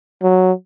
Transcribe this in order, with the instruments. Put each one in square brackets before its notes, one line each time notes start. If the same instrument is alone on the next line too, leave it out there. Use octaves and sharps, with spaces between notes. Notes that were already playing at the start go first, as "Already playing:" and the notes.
[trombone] F#3